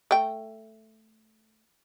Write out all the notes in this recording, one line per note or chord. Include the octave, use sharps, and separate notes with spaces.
A3 G5